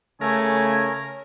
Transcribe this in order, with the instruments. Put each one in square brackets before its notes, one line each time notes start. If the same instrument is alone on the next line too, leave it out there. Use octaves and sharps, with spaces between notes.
[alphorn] C#3 [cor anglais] A3 [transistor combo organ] A#4 [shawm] G#5